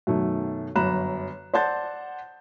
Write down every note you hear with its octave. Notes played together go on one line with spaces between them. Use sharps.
F#2 B2 D#3 A3
G1 F#2 A#5 B5 F#6 E7
C5 D5 F#5 A5 G6 A6